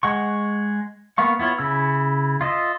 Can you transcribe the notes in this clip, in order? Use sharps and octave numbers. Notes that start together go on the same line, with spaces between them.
G#3 F#5 C#6
A#3 B3 F5 C#6
B3 E4 F4 C#5
C#3 E4 E6
F4 D#5 E5